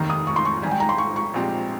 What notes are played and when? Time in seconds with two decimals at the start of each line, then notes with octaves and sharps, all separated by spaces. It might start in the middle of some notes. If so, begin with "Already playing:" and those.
Already playing: F1 D#2 D#3 A#3
0.10 D#6
0.27 C#6
0.36 C6
0.45 C#6
0.62 G#1 G#2 G3 G#5
0.71 G5
0.80 A#5
0.89 C6
0.98 C#6
1.16 C#6
1.34 A#1 A#2 G#3 C4 G4